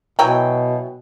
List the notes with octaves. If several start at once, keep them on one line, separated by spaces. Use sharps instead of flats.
B2 E3 F#3 G5